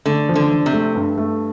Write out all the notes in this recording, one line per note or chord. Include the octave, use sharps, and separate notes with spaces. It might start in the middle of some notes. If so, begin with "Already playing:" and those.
D3 A3
F3
D3
F3
C3
A3
G2
A3